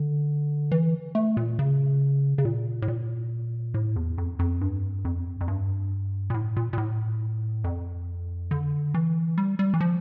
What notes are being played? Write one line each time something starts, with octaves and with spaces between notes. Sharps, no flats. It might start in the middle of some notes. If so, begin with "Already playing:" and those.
Already playing: D3
E3
A3
A#2
C#3
C#3
A#2
A2
A#2
A2
E2
F2
F2
G2
F2
F2
G2
A#2
A2
A#2
A#2
A2
F2
D3
E3
G3
G3
E3
F3